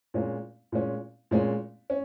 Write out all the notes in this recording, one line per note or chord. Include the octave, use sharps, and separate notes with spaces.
A#2 G#3 C#4
A#2 G#3 C#4
A#2 G#3 C#4
C#4